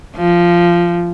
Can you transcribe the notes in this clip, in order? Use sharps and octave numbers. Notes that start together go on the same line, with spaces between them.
F3